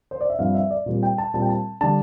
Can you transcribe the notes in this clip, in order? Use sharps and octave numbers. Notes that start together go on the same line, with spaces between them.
C5
D5
E5
G2 F3 C4 F5
E5
D5
A#2 G3 C4
G5
A5
A#2 G3 C4 A5
G5
A5
D3 G3 D4 A5